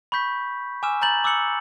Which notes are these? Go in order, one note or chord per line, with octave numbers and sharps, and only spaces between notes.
B5 C#6 G6 B6
G#5 D6 E6 F6 E7
A#5 B5 G6 A6 F#7
D6 E6 F#6 C#7 F#7